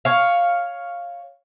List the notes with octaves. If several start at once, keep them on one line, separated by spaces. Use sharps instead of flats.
C#5 F5